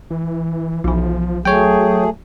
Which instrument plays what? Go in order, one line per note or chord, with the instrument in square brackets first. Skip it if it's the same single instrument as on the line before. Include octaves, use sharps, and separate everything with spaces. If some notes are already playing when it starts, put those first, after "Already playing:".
[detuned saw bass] E3
[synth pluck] B1 E3 [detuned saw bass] F3
[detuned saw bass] F#3 [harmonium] A3 G#4 [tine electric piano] C#5 G5